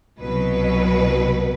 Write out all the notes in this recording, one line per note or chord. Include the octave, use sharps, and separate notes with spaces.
C2 B2 F#3 B4